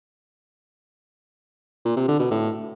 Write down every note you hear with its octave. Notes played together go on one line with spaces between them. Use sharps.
A#2
C3
D3
B2
A2